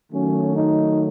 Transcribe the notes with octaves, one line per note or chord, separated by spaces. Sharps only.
D#3 F#3 A3 C#4
D#4